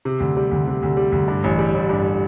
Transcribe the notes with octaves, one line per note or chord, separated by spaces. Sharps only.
C3
D2
G3
D2
C3
D2
G3
D2
G2
A1
G3
A1
G2